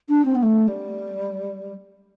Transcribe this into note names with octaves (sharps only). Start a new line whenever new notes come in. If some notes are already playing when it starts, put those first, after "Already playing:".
D4
C4
B3
A3
G3